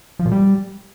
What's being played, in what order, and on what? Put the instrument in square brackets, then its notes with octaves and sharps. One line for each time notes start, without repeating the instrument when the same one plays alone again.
[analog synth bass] F3
A#2
G3